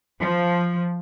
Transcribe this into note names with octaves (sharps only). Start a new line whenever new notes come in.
F3